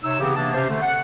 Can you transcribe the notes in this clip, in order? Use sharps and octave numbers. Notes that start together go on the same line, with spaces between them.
C3 D#4 C#5 E6
C#3 E3 B3 C4 G4
C3 E3 A#3 B3 D4 A5
C3 C#4 G4 C5
D3 A3
F#5